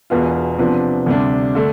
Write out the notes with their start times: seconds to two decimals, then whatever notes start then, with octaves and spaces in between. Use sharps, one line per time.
0.10 E1 E2 B2 B3 F4
0.58 C3 F3 B3 D4
1.06 D2 C3 G3 D4
1.55 D3 A3 D4